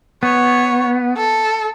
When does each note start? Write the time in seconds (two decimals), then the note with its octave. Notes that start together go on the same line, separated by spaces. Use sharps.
0.23 B3 C#5
1.16 A4